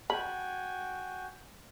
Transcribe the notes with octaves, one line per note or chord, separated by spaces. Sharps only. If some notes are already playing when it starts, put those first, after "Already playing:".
F#4 G5 G#5 B5